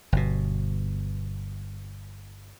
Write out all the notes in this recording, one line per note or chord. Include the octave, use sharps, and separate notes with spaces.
G1 B2